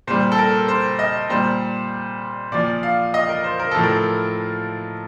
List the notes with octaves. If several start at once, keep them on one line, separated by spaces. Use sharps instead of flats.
A#2 G3 C5
A4
A#4
C5
D#5
A#2 G3 C5
A#2 F3 D5
F5
D#5
A#4
C5
A#4
A2 F3 A4
A#4